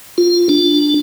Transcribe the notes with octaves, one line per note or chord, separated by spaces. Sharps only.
F4
D4